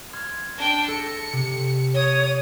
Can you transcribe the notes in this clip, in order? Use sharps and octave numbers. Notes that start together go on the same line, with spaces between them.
C6 F6 G#6
D4 G5
A4 A#6 C#7
C3
C#5 D#6